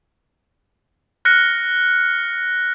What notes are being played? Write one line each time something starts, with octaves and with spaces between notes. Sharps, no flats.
F6 F#6 A#6 C#7